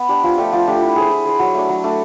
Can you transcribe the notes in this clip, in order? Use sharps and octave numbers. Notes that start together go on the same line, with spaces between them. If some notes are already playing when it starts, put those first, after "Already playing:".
Already playing: B3
D4 G4
F3
A3 D4 G4
F3
A3 D4 G4
E4
G#4 C5
E4
G#4 C5
F#3
A3 D4
F#3
A3 D4